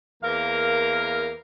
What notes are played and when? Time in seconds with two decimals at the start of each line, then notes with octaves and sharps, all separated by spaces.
0.23 E2 A#3 A#4 F5